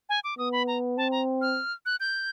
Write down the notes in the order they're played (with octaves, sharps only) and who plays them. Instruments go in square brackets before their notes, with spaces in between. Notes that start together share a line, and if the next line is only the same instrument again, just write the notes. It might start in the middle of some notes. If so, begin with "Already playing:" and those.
[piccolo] G#5
D6
[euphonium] B3 [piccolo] D#6
[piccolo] B5
A#5
[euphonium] C4 [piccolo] A5
[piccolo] A#5
F6
F#6
G6